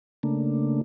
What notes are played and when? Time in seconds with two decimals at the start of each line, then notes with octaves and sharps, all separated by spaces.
0.23 C#3 A3 A#3 D4